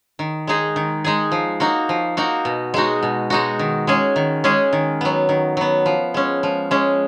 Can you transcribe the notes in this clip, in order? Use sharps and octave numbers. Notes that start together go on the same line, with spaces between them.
D#3
G#3 D#4 G#4
D#3
G#3 D#4 G#4
F3
A#3 D#4 F#4
F3
A#3 D#4 F#4
B2
G#3 D#4 F#4
B2
G#3 D#4 F#4
D#3
G#3 C#4 G#4
D#3
G#3 C#4 G#4
D#3
F#3 B3
D#3
F#3 B3
F3
G#3 C#4
F3
G#3 C#4